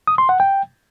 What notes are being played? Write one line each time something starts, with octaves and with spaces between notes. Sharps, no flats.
D#6
C6
F#5
G5